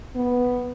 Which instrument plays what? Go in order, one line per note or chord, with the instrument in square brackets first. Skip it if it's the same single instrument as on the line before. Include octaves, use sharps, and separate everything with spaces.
[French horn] B3